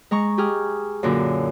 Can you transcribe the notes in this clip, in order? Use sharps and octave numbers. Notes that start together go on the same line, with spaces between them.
G#3 A#5 C#6
G4 G#4 F6
F#2 A#2 D3